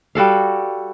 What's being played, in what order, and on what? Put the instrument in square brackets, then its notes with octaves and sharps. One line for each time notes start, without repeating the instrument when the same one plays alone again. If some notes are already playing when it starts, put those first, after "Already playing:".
[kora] G3 F#4 A4 F5